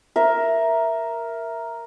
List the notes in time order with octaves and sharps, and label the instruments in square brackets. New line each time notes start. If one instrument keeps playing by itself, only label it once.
[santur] A#4 E5